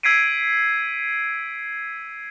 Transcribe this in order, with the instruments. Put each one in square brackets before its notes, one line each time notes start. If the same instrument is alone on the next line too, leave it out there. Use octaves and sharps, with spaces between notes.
[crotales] E6 G#6 B6 C7 D7 D#7